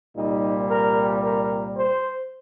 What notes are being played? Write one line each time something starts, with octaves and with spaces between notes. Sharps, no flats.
C2 A#2 G3 D#4
A#4
A#4
C5